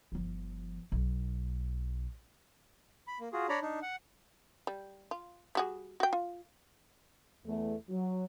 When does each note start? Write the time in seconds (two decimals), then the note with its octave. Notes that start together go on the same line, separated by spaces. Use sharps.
0.12 G1 F3
0.92 B1
3.07 B5
3.20 A#3
3.33 F4 F#4 G#4
3.49 D4 C#5 D5 A#5 B5
3.61 D4 D#4
3.82 F#5
4.67 G3
5.11 F4
5.55 G3 F#4 G#4
6.00 F#4 G5
6.13 F4
7.47 E2 A3
7.90 F#3